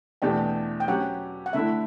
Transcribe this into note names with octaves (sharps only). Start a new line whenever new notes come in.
E2 B2 A3 D4 G4 G5
G5
F#3 C#4 G4 F#5
F#5
D3 A3 E4 E5